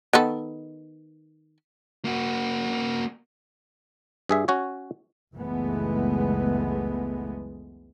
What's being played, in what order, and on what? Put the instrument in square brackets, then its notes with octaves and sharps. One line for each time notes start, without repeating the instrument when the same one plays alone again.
[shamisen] D#3 B3 A4
[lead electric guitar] A#3 F#4
[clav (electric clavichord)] G2 G#4 E5
C#4 F#4 C#5
[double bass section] F#1 C#2 E3 G#3 A3 B3